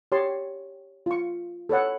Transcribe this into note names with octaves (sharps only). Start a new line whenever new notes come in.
G4 C#5 A5 C6
F4 C#6
A4 B4 C#5 F#5